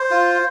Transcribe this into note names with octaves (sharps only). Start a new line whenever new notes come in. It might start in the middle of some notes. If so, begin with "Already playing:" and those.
Already playing: C5
F4